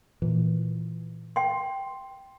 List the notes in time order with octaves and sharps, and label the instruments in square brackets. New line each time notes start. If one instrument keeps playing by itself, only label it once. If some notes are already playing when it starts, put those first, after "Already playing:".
[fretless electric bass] A#2 E3
[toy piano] G5 C6